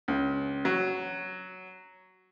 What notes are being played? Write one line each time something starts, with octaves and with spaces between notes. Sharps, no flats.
C#2
F#3